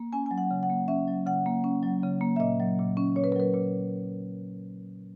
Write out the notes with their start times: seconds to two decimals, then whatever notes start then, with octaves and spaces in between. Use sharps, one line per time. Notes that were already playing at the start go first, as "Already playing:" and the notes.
Already playing: A#3
0.13 C#4 G#5
0.26 F#3 G#5
0.38 F#5
0.51 C#3
0.63 F#5
0.70 A#3
0.88 C#4 E5
1.07 F#3
1.26 C#3 F#5
1.46 A#3
1.64 C#4
1.83 F#3
2.03 C#3
2.21 A#3
2.36 E5
2.40 A#2 D#5
2.60 F#3
2.79 A#2
2.97 C#4
3.16 A#2 C#5
3.24 B4
3.32 A#4
3.36 F#3 B4
3.54 A#2